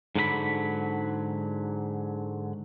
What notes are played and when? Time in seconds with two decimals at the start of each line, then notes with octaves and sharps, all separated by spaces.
0.16 G#2 D3 F#3 B4 B5